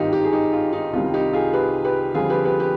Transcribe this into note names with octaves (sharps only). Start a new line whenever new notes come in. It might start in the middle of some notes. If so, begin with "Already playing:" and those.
Already playing: G#1 G2 D#3 D#4 F4 G4
D#4 G4
G#4
D#4 G4
F4
D#4
C2 C3 D#3 G3 F4
D#4 G4
F4 G#4
G4 B4
G4 B4
F1 F2 D3 G3 F4 G#4
G4 B4
G4 B4
G4 B4